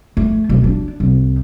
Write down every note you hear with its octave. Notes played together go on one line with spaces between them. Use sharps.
A3
B1
D4
C2